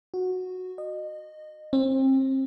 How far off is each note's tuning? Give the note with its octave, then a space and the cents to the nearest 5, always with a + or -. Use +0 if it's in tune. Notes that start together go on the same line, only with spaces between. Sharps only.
F#4 -10
D#5 -25
C4 +30